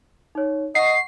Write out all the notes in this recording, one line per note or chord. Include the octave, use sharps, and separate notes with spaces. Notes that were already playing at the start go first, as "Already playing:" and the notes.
D#4 C#5
D#5 F#5 C#6 C7